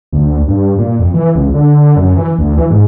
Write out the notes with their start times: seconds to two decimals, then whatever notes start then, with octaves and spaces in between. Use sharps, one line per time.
0.13 D2
0.48 G2
0.78 A#2
0.99 F2
1.14 E3
1.35 C#2
1.54 D3
1.96 F#2
2.16 E3
2.38 D2
2.58 E3
2.70 G#2